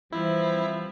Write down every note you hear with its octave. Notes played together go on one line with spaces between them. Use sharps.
E3 F3 G3 C4 E4